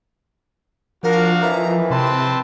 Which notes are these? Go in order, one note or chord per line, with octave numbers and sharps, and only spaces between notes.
F3 D4 F#4 A#4 F5
F2 D#3 E3 A#5
C3 C4 B4 A5 C6